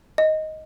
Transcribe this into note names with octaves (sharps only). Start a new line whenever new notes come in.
D#5